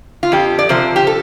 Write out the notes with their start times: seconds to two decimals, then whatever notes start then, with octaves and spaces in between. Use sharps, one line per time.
0.23 F4
0.32 F2 G4
0.59 D5
0.69 C3 F3 C5
0.96 G4
1.07 A4